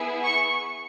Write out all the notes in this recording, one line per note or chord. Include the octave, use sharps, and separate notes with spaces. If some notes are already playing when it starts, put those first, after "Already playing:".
Already playing: B3 E4 G#4
C#6